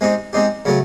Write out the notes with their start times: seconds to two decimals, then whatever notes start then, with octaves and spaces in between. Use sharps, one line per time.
0.01 G#3 C4 D#4 G4
0.33 G#3 C4 D#4 G4
0.65 C#3 F#3 A3